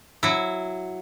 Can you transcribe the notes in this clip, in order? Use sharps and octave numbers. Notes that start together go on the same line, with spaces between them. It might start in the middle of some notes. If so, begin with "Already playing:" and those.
F#3 E4